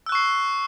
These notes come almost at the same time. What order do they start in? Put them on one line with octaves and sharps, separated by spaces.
E6 F#6 C#6 C7